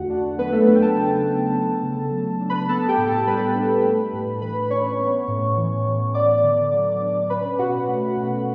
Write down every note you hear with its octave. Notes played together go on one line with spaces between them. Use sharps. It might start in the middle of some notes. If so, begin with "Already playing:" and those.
Already playing: E2 D3 A3 F#4 F#5
D4
F#3 B3 B4
A3 A4
E2 B3 B4
G5
A4 A5
C#3
A3
B3
C#3
F#3
D4
B4 B5
B3 A4 A5
G4 G5
A2
A4 A5
G3 B4 B5
D4
A3
A2
E3 B4 B5
C#4 C#5 C#6
B3
A2
E3
A2
B3 D5 D6
D3
F#3
D4
C#4 B4 B5
B2 F#4 F#5
A3
B2